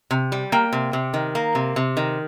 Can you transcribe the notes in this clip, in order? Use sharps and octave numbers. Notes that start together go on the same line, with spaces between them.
C3
G3
A#3 G5
C3
C3
D#3
A#3
C3
C3
D#3